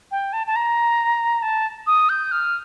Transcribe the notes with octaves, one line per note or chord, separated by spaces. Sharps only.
G5
A5
A5
A#5
A5
D#6
G6
F6